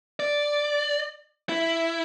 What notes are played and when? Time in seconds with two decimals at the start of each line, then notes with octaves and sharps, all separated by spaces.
0.20 D5
1.49 E4